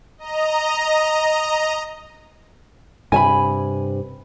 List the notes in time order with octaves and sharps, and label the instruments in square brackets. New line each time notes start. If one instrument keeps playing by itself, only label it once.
[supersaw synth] D#5 A#5
[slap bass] G2 C3 [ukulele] G#5 A5 B5